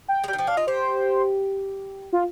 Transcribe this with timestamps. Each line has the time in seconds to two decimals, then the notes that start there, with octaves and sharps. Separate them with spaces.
0.08 G5
0.24 G#3
0.28 G3 G5
0.33 D#3
0.38 F3 G5
0.47 D4 F5
0.57 F4 D#5
0.67 G4 C5
2.13 F4